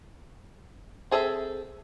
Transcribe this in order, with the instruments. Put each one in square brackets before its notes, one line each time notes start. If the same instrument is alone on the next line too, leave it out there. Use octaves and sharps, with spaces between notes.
[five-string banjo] C4 G#4 A4 D5 E5